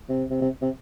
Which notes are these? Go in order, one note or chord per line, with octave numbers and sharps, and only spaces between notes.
C3
C3
C3
C3